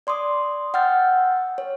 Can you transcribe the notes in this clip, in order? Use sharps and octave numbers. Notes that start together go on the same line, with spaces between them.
D5 C6 D6 D#6
F#5 G5 E6 F6 G6 A6
C#5